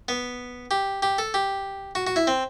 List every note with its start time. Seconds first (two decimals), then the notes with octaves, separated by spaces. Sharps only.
0.08 B3
0.71 G4
1.02 G4
1.18 A4
1.34 G4
1.95 F#4
2.07 F#4
2.16 E4
2.27 C4